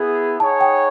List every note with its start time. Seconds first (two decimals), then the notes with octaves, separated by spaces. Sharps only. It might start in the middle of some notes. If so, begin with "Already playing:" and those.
Already playing: B3 E4 G#4
0.39 D#4 G#4 C#5 F#5 A5
0.61 G5